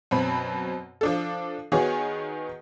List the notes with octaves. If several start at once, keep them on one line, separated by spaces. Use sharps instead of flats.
F#2 B2 C4 B5
F3 D4 A4
D#3 B3 F#4 G#4 C#5